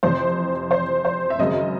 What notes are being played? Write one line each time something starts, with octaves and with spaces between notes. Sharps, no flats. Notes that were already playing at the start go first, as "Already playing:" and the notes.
F2 C3 E3 C5
C5
C5
E5
G#1 F#2 C#3 D#5